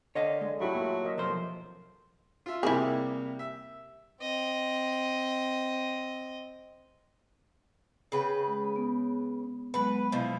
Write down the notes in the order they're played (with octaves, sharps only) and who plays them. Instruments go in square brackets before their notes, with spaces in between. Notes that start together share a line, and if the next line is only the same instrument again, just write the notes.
[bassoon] D3 [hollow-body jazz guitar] C#5 D#5 F5
[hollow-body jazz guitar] G#3
[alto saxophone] F#3 [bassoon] A3 [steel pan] E4 G4 B5
[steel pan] A#3 F4
A#4 D#5 E5
[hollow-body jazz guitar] B1 F3 C5 [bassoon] F2 [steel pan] A#4
[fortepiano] F4 E5
[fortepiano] C3 G3 A#3 [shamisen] E4 G#4
[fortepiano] E5
[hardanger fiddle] C4 D#5
[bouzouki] C#3 B4 G5
[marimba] G#3
B3
[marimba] F#3 G#3 B3 [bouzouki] B4 F#5
[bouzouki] B2 F3 E4